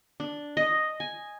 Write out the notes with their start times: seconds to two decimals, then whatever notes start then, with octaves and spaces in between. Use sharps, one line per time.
0.20 D4
0.57 D#5
1.00 G#5